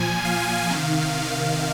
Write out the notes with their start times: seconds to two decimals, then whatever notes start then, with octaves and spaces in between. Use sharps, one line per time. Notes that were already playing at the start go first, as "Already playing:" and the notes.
Already playing: A#2 F3 G#5
0.24 F5
0.69 C3 D#3